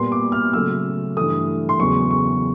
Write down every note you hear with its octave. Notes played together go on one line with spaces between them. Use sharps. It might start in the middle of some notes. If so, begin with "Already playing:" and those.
Already playing: A#2 G3 B3 C6
D6
F6
C#3 F#3 A3 E6
G2 E3 A3 D#6
C6
E2 C#3 F#3 B3 C#6
C#6